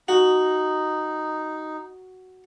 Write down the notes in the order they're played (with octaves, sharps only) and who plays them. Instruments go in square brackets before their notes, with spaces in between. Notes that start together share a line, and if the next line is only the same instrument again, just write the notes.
[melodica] D#4 [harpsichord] F#4